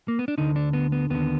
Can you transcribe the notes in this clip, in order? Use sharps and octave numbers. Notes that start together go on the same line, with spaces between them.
A#3
B3
D4
D2 D3 D#4
D4
B3
B3
D#2 D3 B3